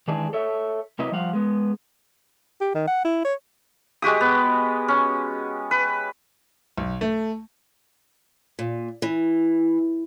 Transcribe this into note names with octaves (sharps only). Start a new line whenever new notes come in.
D#3 E3 G#3 D4 G#4
A4 C#5 E5
C3 F#3 A#3 E4 B4 D#5
F3 G3 C5 F5 F#5
G#3 B3
G4
D#3
F#5
E4
C#5
G#3 F#4 G4 D#6
B3
C#4
B4
B1
A3
A#2
E3